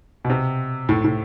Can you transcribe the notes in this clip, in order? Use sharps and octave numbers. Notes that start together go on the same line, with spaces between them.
B2
C3
A2
A2